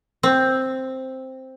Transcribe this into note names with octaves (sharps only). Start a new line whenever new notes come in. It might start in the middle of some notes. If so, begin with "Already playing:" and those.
C4